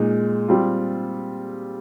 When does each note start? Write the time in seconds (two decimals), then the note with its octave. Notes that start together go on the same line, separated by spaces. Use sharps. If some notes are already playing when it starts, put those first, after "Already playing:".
Already playing: A#2 G#3 D#4
0.48 G3 C4 F4